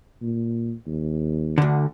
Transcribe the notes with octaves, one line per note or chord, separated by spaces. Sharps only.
A#2
D#2
D2 D3